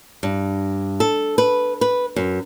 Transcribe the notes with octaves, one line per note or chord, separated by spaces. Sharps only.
G2
A4
B4
B4
F#2